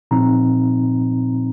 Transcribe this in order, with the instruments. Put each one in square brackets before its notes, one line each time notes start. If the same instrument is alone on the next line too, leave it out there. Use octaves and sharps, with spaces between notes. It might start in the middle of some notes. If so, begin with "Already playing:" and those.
[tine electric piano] A#2 F3 C4 D#4 A#5